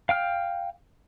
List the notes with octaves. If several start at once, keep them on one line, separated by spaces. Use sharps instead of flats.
F5 G5 F6